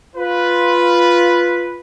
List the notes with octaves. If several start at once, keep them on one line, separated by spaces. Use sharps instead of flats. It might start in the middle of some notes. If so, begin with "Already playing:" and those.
F4 B4